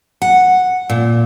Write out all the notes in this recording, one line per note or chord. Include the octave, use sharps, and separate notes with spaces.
F#5
A#2